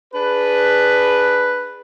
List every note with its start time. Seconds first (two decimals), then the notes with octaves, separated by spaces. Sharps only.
0.13 D4 G#4 B4